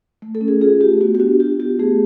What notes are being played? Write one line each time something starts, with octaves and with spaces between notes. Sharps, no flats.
A3
A4
C#4
G#4
F4 G#4
A3 G4
B3 F#4
G4
D4 F#4
F4 G4
B3 G4
A3 G#4